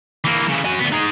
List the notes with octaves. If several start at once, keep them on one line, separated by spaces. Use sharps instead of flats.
E3 A#3
C#3 E3
F#4 G#5
D2 B3
D#4 G#4